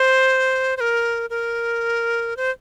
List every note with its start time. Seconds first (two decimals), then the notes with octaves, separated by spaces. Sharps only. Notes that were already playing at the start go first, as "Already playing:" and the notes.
Already playing: C5
0.77 C5
0.80 A#4
1.30 A#4
2.37 C5